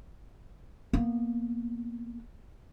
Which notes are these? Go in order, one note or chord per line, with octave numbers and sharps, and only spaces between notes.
A#3 B3